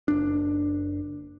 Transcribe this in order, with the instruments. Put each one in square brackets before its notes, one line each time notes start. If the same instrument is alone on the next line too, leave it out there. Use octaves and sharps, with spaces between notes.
[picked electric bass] F#1 D4